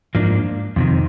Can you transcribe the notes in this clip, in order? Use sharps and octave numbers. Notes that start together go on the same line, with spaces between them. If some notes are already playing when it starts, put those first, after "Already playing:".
G#2 F3 A#3 D4
F2 C3 D#3